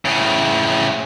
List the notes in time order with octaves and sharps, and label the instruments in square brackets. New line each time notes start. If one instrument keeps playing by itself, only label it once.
[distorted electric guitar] A2 C#3